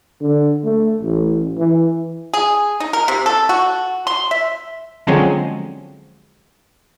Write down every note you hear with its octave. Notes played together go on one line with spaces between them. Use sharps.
D3
A3
A1
E3
G#4
D#4
A#4
C3
A4
F#4
C6
E5
D3 F3 F#3 G#3 C4 C#4